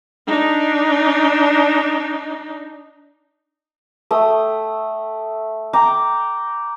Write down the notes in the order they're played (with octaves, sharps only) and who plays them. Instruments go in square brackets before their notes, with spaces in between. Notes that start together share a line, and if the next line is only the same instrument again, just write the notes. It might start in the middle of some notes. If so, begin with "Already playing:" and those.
[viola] D4 D#4
[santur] A3 G5 D#6
G5 A#5 D6